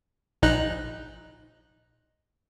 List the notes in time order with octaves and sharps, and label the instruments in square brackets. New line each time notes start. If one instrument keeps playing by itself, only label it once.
[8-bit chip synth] A#1 D#4 F#6